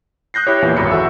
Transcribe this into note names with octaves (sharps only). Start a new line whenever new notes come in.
D#6 F#6 G6 A#6 C7
E4 G4 C#5
E2 A#2 E3
G#1 F#2 C#3 B5 C#7
F#4 A4 E5 E6